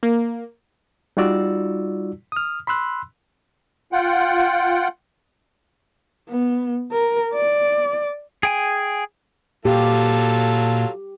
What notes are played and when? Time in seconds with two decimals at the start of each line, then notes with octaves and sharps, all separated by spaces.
0.03 A#3
1.17 G3 D#4 F4 F#4 D5 E6
2.32 D#6 F6
2.67 B5 C6 E6 F#6
3.92 F4 F#5 G5
6.29 B3
6.92 A#4
7.35 D5
8.43 G#4 G5 G#5
9.65 A#2 F#3 F4 G4 A4